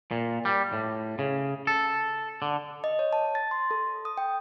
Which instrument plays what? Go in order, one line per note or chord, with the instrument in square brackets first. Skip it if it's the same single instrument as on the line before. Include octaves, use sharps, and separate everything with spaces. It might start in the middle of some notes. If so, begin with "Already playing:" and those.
[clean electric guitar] A#2
G3
A2
C#3
A4
D3
[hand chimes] D#5
C#5
A5
A6
C6
A4
D#6
G5